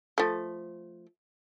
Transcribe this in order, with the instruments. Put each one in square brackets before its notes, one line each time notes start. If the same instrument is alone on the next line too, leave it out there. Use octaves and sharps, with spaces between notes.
[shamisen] F3 A3